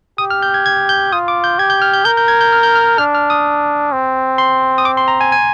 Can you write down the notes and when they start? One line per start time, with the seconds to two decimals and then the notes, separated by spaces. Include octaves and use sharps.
0.18 G4 D#6
0.30 F6
0.43 G6
0.54 G#6
0.66 G#6
0.89 G6
1.12 F4 D#6
1.28 D6
1.44 G6
1.59 G4 G#6
1.70 G6
1.82 F6
1.94 G6
2.05 A#4 G6
2.17 G6
2.28 G#6
2.41 G6
2.53 F6
2.63 G6
2.75 F6
2.98 D4 F6
3.15 F6
3.30 D#6
3.92 C4
4.38 C6
4.78 D#6
4.85 D6
4.97 C6
5.08 A#5
5.21 G#5
5.32 G#5